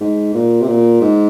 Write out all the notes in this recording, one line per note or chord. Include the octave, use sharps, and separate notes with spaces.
G#2
A#2
C3
A#2
G#2